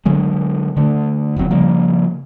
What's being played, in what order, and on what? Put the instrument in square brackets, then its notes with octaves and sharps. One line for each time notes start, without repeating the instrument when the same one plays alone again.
[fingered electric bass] D3 F#3 G#3
D3 A3
F1 C#2 F#3 C4
C#3 F3 G3 A#3